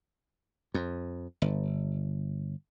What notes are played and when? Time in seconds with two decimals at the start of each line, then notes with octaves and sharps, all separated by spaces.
0.74 F2
1.42 G1